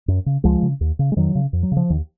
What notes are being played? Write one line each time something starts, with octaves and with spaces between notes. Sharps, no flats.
F#2
C#3
C#2 F3 G#3
C#3
D#2
C#3
G#3
F2 D#3 F#3
C#3
F2
F#3
C#3
F3
D#2 D#3